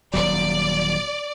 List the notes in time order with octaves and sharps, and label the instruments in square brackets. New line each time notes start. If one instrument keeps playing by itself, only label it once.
[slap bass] D#1 F#3 [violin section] D5